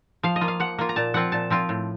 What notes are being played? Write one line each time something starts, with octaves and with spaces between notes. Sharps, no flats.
F3 F5
D#5
A#3 F4
F5
F3 F#5
A#3 F4
A#5
A#2 A5
F3 C4 F4 F#5
A#2 A5
F3 C4 F4
A2